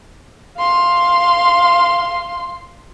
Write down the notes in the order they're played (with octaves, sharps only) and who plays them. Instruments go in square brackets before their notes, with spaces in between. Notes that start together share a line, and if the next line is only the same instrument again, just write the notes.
[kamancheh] F5 C6